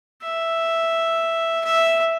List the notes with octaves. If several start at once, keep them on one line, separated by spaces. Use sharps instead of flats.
E5
E5